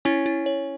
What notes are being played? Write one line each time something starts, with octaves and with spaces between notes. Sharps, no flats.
C#4 E4
E4
C#5